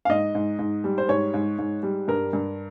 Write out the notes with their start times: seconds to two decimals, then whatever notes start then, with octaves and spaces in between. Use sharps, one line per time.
0.05 F5
0.10 G#2 D#5
0.35 G#2
0.59 G#2
0.84 G3
0.98 C5
1.09 G#2 C#5
1.34 G#2
1.59 G#2
1.83 G3
2.08 G2 A#4
2.33 G2